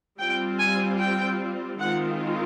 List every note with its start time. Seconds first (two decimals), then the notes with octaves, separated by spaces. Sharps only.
0.19 G3 C4 F4 G5
0.58 G#5
0.99 G5
1.79 D#3 G#3 C4 F4 F#5